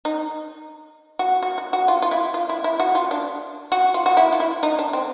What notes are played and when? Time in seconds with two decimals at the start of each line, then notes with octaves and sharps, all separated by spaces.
0.05 D#4
1.19 F#4
1.43 F#4
1.58 F#4
1.73 F#4
1.88 F4
2.02 F4
2.11 E4
2.34 F4
2.49 E4
2.64 E4
2.80 F#4
2.95 F4
3.11 D4
3.72 F#4
3.94 F4
4.06 F#4
4.17 E4
4.32 F4
4.40 E4
4.63 D#4
4.79 D4
4.93 C4